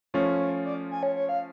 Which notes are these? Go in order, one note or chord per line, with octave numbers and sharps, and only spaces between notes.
F3 A3 C#4 F4 C#5
D5
G#5
C#5
C#5
F5